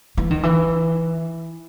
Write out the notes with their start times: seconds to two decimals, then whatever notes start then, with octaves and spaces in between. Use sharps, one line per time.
0.17 E3
0.31 D#3
0.43 E3